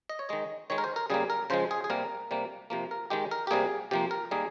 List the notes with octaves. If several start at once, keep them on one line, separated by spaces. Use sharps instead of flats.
D#5
C#5
D#3 G#3 D#5
D#3 G#3 C#5
A#4
C5
A#4
C#3 G3 A#3 G#4
A#4
C#3 F3 G#3 C5
G#4
G#4
C3 G3 A#3 A#4
C3 G3 A#3
C3 F3 A#3
A#4
D#3 G#3 G4
A#4
G4
C3 G3 A#3 G#4
C3 F3 A#3 G4
A#4
D#3 G3 A#3 G#4